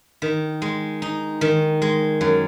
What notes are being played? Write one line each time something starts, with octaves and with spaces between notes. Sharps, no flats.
D#3
G#3
D#4
D#3
G#3
F#2